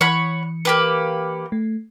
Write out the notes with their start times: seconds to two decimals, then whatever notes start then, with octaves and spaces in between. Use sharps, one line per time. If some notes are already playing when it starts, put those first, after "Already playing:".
0.01 E3 C#5 F#5 B5 C#7
0.65 A#3 G4 B4
1.52 A3